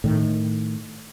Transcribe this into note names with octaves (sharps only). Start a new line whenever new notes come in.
A2 D#3